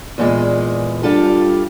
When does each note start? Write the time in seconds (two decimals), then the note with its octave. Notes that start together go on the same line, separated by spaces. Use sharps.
0.18 E2 A#2 G#3
1.03 G3 D4 F4 A4